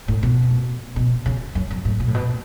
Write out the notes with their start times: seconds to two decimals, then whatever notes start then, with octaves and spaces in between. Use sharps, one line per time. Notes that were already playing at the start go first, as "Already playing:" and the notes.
0.08 A2
0.23 B2
0.96 B2
1.26 C#3
1.55 F#2
1.71 F#2
1.85 A2
2.00 B2
2.07 A2
2.14 B2